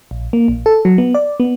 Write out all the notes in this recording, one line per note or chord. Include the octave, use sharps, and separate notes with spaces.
A#1
A#3
A#1
A4
F#3
B3
D5
B3